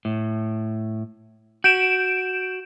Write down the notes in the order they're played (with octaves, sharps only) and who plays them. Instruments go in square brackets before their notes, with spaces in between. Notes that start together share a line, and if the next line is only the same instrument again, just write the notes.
[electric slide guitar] A2
[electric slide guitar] F#4 [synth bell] G6 D7 E7